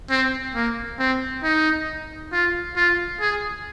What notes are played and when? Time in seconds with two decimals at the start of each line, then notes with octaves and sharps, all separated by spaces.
0.10 C4
0.55 A#3
0.99 C4
1.43 D#4
2.33 F4
2.76 F4
3.21 G#4